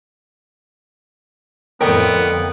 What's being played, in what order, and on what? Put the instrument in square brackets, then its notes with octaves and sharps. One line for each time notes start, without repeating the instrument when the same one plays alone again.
[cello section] F2 A2 [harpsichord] D3 D#5 C#6 [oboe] B3 [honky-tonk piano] A#4 G5